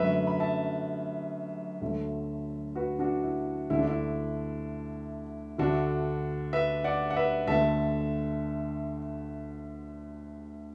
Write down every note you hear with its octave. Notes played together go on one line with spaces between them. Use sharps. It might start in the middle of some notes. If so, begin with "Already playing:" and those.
Already playing: F#2 D3 F#3 A3 B4 E5
B5
E5 A5
D2 D3 F#3 A3
F#4 B4
D4 F#4
E4
D2 D3 A3 E4
D4
E4
D2 D3 A3 D4 F#4
B4 E5
D5 F#5
F#5
B4 E5
D2 D3 A3 E5 A5